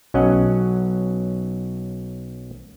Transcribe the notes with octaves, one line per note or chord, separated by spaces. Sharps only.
B1 F#3 C#4 D#5 F#5